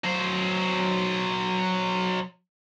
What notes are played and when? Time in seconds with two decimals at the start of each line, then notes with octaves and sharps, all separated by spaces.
0.04 F#3 C5